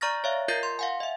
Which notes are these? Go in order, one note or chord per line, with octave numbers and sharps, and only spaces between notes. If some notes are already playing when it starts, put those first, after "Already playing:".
D5 A#5 C#6 F6 A6 A#6
C#5 E5 F5
F4 A#4 D#5 G6 A6 C7
C6
F5 F#5 G#5
D#5 E5